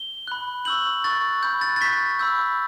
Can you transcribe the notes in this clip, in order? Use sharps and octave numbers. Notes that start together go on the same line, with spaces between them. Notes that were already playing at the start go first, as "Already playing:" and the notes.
Already playing: G7
B5 F#6
C#6 E6 G6 F#7
C#6 F#6 A6
B5 F#6 G6
A6
A6
C#6 G6 B6
B5 E6 G6